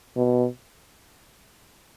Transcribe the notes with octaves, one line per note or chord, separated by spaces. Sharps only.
B2